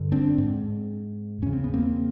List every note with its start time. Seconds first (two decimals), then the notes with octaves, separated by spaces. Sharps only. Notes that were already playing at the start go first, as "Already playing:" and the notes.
Already playing: G2 D3
0.12 C4 D4
0.38 G#2
1.42 E2 C#3 C#4
1.53 C4
1.64 B3
1.74 A#3 C4